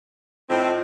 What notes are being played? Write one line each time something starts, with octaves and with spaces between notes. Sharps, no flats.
A2 C4 F4 C5 D#5